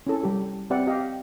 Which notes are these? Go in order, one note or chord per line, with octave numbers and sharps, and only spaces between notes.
C#4 E4 A4
G3 G4
C4 G4 B4 D5 E5 F#5
G4 D#5 F5